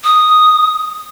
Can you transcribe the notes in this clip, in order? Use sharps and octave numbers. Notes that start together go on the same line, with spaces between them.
D#6